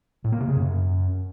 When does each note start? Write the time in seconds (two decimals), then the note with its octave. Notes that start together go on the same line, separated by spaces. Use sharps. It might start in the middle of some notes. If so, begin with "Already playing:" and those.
0.24 A2
0.32 A#3
0.40 C3
0.48 C#3
0.56 F#2